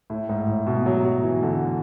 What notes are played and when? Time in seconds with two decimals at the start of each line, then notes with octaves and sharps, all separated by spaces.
0.10 A2
0.29 G#2
0.47 A2
0.66 B2
0.86 F#3
1.05 F#3
1.24 E3
1.43 D3